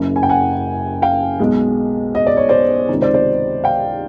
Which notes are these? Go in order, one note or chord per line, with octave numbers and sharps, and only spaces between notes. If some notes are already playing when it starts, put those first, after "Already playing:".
Already playing: F#1 F#2 C#3
G#5
G5
F#5 G#5
F5 G5
B1 B2 G#3
D#5
D5
C#5
C5 D5
C#2 C3 D#3
C5 D5
C5 D5
F5 G5